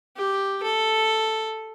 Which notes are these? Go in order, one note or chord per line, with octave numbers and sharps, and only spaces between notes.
G4
A4